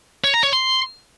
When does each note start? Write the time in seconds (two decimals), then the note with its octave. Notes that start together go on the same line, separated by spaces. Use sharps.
0.24 C#5
0.34 A#5
0.43 C#5
0.53 C6